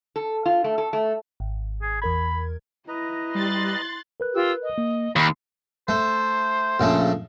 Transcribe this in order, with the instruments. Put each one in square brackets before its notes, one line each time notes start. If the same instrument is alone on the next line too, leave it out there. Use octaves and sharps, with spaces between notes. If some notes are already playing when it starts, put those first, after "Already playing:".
[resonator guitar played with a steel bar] A4
F4
A3
A4
A3
[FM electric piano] G#1
[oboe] G#4
[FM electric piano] E2 A#4 G#6 [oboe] B5
[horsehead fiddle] E4 [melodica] B4 D#5 A#5
[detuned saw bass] G3 [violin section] C6 F#6 A6
[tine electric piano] A#4 B4 F#6
[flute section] F4 G4 E6
D#5
[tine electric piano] A#3
[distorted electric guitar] D#2 [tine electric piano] D#3 [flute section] B5
[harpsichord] A3 [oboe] C5
[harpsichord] A#1 C#3 A3